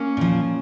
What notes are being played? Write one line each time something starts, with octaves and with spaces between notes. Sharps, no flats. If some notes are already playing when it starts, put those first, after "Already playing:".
Already playing: A#3 C#4
A#2 F3